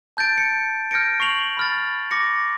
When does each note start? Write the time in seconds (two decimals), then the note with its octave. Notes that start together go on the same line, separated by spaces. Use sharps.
0.17 A5 G6 A6 D7
0.38 C#7
0.91 F6 G6 A#6 C#7 D7
1.20 C#6 C7 F7 F#7
1.57 B5 F6 A6
2.11 D6 A#6 C#7